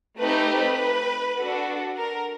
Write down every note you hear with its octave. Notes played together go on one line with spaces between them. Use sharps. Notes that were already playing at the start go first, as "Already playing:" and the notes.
A3 C4 D#4 G4 B4
B4
D4 F#4 A4
A#4